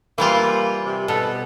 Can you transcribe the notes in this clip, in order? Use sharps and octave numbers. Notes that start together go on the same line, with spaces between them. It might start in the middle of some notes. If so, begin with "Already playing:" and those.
E3 G3 A#3 F4
C3
B2 A4